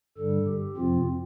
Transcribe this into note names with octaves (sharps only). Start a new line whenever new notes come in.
G2 D3 G3 A4
G4
F2 C3 F3 C4 F4